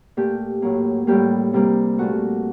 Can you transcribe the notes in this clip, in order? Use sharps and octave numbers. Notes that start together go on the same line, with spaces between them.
A#2 A3 G4
A2 F#3 A#3
A2 G3 A#3 G4
C3 G3 A#3
A#2 A3 F#4